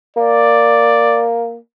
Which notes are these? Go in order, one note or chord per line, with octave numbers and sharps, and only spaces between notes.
A#3 D5